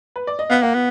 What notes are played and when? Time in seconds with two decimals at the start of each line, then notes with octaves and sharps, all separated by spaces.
0.16 B4
0.27 D5
0.39 D#5
0.50 B3 F5
0.62 A#3 F#5
0.74 B3